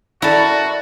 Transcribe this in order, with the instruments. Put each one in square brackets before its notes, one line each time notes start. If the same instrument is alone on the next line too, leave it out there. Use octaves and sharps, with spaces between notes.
[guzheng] E4 [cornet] F#4 [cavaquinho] A4 A#4 [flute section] D5